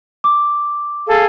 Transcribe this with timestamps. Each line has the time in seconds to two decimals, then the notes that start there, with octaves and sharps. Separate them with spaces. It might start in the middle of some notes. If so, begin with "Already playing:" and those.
0.24 D6
1.06 G#4 A4 F5